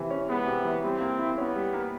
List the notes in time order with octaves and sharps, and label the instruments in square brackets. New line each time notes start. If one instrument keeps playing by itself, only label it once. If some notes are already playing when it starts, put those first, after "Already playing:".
Already playing: [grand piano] C3 E3
C#4
[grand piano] G#3 [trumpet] B3
[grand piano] C3
E3
[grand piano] G3 [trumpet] C4
[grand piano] A#3
E4
[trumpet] B3 [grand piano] C#4
[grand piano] G3
A#3